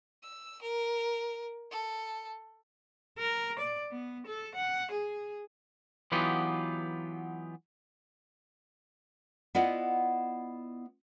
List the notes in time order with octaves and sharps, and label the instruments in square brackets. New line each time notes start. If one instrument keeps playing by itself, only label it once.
[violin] E6
A#4
A4
[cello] A#4
D5
B3
A4
F#5
G#4
[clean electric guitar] E3 F#3 B3 D#4 F4 G4
[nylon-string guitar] B3 E4 F4 D5 D#5 F#5